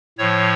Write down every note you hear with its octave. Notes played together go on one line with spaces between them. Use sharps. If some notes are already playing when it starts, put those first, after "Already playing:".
A2 F3 C#5